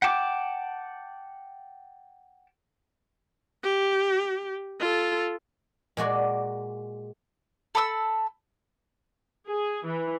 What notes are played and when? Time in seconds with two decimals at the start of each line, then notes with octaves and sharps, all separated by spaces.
0.02 F#5 G5 A5 D6
3.64 G4
4.80 F4 A4
5.97 A#2 G#3 F#4 D5
7.75 A4 B5 D6 E6
9.46 G#4
9.85 E3